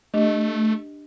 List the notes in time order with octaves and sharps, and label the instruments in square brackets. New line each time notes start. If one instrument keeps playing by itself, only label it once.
[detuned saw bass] A3 [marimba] D4 G4 D#5